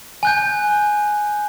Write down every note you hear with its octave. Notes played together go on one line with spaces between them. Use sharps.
G#5 F#6 G6